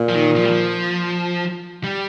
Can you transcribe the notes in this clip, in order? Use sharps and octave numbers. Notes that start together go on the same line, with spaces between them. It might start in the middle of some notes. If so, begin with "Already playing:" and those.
Already playing: A#2
F3
D#3
F3
G3
F3
G3